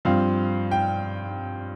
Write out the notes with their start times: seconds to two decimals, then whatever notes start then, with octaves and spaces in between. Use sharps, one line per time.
0.05 G2 F3 C4 F5
0.71 G5